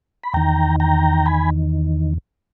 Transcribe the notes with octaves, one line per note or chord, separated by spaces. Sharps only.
B5
E2 D#3 G5 A#5
G5 A#5
G#5 B5